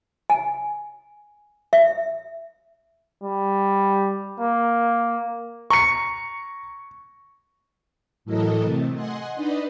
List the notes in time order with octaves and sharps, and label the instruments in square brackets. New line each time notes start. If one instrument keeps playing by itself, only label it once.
[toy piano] G#5
E5
[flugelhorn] G3
A#3
[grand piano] A#5 C#7 [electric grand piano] C#6
[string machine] A2 E3 F#3 A4 A#4 D#5
C3 A3
D#5 F#5 G#5 C6
D4 D#4 B4 D5 D#5